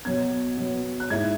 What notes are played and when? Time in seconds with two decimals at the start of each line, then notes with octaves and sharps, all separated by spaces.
0.05 B2 F#3 B3 G#6
0.57 B2 F#3 B3
1.00 F#6
1.10 G#2 G#3 E4 G#6